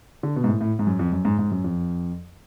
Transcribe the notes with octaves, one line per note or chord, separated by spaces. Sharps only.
D3
B2
G#2
A2
A2
G#2
F#2
F2
F#2
G#2
G#2
F#2
F2